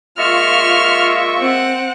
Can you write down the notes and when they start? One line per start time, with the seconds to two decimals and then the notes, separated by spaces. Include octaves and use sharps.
0.18 G#3 A#3 F4 E5 C#6 F6
1.40 C4 F#5